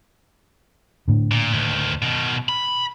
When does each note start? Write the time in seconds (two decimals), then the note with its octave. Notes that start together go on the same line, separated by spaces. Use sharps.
1.08 A2 D3
1.32 A#2
1.53 D2 D#3
2.02 B2 D#3
2.49 B5